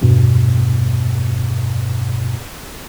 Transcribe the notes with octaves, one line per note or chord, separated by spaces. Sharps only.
E2 G2 B2